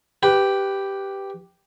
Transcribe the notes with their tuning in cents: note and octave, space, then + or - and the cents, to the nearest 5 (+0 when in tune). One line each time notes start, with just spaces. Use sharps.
G4 +0 B4 +10